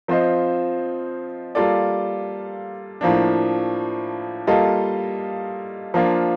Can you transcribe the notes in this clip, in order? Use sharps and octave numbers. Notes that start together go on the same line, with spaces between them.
F3 C4 F4 C5 D#5
G3 A#3 F4 A4 D5
A2 F3 A#3 D4
G3 A#3 F4 A4 D#5
F3 A#3 D4 F4